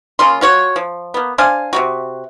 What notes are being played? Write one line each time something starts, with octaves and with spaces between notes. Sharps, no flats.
C#3 A#3 F4 C6
F4 F#4 C#5
F3
A#3 B3
D4 C5 F5 G#5
C3 G3 F#4